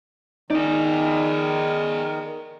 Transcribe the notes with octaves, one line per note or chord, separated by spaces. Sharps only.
D#3 D#4 G#4 D5